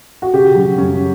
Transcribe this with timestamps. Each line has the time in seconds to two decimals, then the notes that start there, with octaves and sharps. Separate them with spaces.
0.22 F#4
0.34 C#3 G4
0.55 F#3
0.78 F#2 C#4